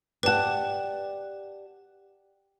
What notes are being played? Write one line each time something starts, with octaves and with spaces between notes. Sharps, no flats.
G4 B4 D5 F#5 A5